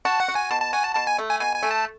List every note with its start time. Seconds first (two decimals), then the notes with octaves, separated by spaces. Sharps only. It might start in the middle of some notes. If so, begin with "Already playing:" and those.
0.05 F#4 A5
0.20 F#5
0.28 F#4
0.35 G#5
0.51 B2 A5
0.61 A5
0.73 F#4 G#5
0.85 A5
0.95 B2 A5
1.07 G#5
1.19 A3
1.30 G#5
1.40 B2 G#5
1.56 G#5
1.63 A3
1.71 A5